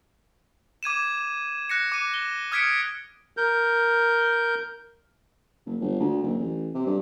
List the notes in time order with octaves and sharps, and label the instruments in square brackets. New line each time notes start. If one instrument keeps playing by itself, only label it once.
[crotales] D6 G#6 D#7 E7
F#6 A#6 C#7
D6 D#7
G7
D#6 F6 G#6 B6 C#7 D7
[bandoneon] A#4 G6
[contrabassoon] F#1
G1
D2
F#1
A1
C3
G2